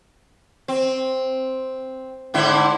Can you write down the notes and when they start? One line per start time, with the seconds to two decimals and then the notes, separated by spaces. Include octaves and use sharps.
0.68 C4
2.34 G#2 D3 E4